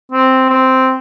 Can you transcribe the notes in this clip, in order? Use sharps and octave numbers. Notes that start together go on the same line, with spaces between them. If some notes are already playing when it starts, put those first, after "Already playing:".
C4
C4